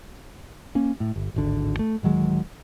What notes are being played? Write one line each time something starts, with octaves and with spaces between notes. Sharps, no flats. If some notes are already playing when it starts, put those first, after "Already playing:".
A#3 C#4
A2
G1
D1 G#1 D3
A3
D1 D#3 F#3 G#3